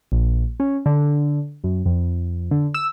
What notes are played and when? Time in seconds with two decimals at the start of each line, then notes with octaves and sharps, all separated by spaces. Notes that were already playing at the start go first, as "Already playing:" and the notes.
0.12 A#1
0.60 C#4
0.86 D3
1.64 F#2
1.86 F2
2.51 D3
2.74 E6